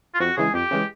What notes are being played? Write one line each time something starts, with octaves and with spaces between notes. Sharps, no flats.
F4
F2 F#4
C#3 E3 G#3 G#4
F2 G4
C#3 E3 G#3